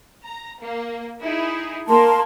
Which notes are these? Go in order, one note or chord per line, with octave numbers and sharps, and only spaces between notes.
A#5
A#3
D#4 E4 G#4
A#3 A#4 A5 C6